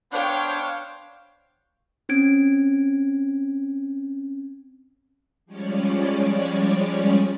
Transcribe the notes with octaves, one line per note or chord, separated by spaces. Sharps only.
B3 D4 C5 C#5 F5 G5
C4 C#4 G#6 D7
F3 G3 G#3 C#4 C#5 D5